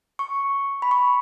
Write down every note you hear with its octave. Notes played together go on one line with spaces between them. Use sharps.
C#6
B5
C#6